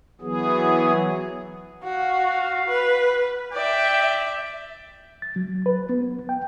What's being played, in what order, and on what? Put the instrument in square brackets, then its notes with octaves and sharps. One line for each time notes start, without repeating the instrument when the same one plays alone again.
[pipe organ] E3 F#3 B3 G#4
[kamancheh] F#4 [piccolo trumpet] F5
[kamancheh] B4
[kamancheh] D5 E5 [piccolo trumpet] G5
[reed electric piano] A6
F#3
B4
B3
G5